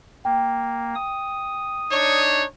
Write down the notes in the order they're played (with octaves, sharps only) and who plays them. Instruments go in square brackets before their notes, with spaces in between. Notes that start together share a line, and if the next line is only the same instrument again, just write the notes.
[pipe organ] A#3 [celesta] G5
[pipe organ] D#6
[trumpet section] D4 D#4 C#5